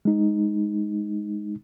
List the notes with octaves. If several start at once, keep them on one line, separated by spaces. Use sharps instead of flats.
G#3 D#4